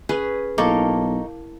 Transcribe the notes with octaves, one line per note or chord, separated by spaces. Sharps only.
C#4 G#4 B4
B1 A#3 D#4 E4 A4 A5 C#6 D6